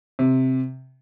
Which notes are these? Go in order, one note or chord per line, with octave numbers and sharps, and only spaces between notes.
C3